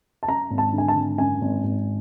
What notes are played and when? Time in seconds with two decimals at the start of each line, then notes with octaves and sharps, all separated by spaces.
0.23 A5
0.28 F#2 A#5
0.51 G#1
0.58 A5
0.73 D3
0.78 G#5
0.88 A5
0.96 G#1
1.18 F#2 G#5
1.41 G#1
1.64 G#1